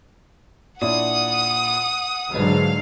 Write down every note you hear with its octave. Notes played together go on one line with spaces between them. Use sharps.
A#2 D4 E4 F#5 D#6
G#2 D3 F#3 G#3 B4 F5